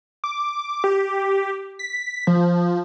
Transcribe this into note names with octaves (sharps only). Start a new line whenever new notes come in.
D6
G4
B6
F3